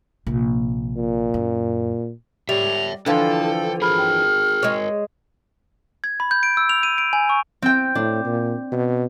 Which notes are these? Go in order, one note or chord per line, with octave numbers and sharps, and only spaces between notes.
A#1 C3
A#2
F#2
G3 G4 C#5 E5 F7
D3 E3 F3 D4 A4 F5 G5
G#4 A#4 B5 F6
G5
G#3 C#5
G#6
B5
G6
D7
E6
F7
D#7
D7
G#5
C#6
C4 G5
A2 D4
A#2
B2